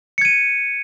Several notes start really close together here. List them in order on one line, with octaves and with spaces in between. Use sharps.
C#7 G#6 D#7